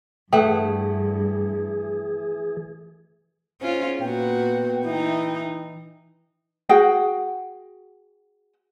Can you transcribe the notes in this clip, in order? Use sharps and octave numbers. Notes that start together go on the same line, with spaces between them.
G2 E3 A3 G#4 F#5 G5
G#2 C#4 F4
A#2 B3 F#4 G5
E3 D#4 E4
F#4 G#4 F#5 G5